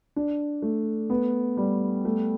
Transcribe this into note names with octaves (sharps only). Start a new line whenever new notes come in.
D4
A3
B3
G3
A3